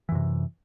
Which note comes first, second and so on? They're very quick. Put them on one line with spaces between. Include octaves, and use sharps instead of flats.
E3 F#2 C3